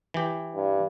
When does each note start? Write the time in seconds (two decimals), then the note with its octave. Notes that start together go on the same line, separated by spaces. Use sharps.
0.14 E3 G4
0.55 G2